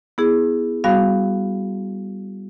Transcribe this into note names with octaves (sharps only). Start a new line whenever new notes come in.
B3 E4 G#4
G3 B3 F#4 F5